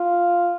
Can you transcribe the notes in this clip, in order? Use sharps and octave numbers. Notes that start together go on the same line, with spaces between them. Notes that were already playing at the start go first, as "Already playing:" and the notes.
Already playing: F4